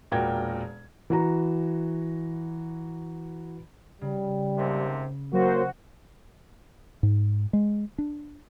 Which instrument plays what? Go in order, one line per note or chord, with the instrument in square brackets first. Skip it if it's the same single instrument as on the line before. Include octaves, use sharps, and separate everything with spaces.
[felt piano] E1 A#2 F#4 A#4 G5 G#6
E3 F#4 A#5
[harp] C#3 [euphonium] G3
[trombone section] D#2 G#2 C3
[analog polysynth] F#3 C5 [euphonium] A#3 [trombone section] F#4
[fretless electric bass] G#2
G#3
D4